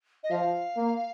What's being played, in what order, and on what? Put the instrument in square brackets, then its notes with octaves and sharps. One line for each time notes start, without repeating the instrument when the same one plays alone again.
[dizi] D#5
[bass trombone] F3 [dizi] F5
[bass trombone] A#3